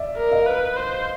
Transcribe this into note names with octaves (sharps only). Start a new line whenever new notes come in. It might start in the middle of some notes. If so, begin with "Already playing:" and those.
Already playing: D5 E5
A#4
D#5 F5
B4
C5